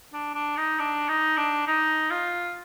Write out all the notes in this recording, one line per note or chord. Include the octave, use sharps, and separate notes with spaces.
D4
D4
D#4
D4
D#4
D4
D#4
F4